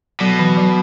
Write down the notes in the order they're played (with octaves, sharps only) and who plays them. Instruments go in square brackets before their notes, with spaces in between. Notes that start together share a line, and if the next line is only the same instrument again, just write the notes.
[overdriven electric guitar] B2 [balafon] F#3
[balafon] E3
F#3